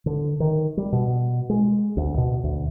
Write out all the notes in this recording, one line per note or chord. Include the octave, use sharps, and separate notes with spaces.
D3
D#3
G3
B2
G#3
D2
B2
D2